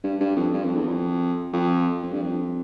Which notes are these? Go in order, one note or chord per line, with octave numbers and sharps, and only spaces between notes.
G2
G2
F2
G2
F2
E2
F2
F2
F2
G2
F2